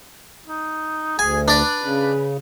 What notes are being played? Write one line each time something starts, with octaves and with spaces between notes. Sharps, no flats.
D#4
D2 G#4 G#5
D4 B4 D5
C#3